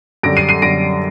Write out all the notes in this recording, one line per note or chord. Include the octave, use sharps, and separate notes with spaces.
F#2 D3 G3 A#6 D7
C7 D#7
C7 D#7
F#2 D3 G3 A#6 D7